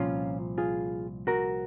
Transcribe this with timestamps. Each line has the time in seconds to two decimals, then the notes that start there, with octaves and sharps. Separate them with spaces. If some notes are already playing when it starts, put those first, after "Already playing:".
Already playing: C2 A#2 F3 C#4 F4
0.58 F4 G#4
1.27 F#4 A#4